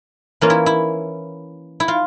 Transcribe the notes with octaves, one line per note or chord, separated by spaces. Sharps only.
E3 A#3 C#4 F4
E4
E4
E4
F4